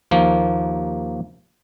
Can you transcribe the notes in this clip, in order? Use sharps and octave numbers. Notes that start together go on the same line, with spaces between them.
D#2 F3 A#3